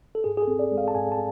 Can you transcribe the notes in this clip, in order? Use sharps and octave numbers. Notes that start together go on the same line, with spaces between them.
A4
G#2 G#4
G#4
A4
C4
D5
G#3
F5
A5
G#2 G#5
A5